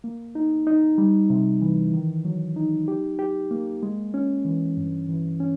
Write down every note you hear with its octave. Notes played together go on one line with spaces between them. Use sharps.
A#3
D#4
D#4
G3
C3
E3
D#3
F#3
D#4
G4
G4
A#3
G#3
C#4
E3
G2
E3
C#4